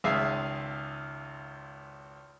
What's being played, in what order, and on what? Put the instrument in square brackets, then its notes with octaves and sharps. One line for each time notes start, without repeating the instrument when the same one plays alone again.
[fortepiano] G#1 C#2 G#4 E5 F5 D#6